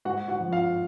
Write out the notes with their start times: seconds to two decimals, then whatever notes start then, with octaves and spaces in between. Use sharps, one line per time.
0.05 G#2 F#4 F#5
0.28 F#4 F#5
0.40 F3
0.51 F4 F5